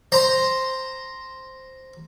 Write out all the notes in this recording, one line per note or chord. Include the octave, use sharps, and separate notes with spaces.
C5 A#5 C6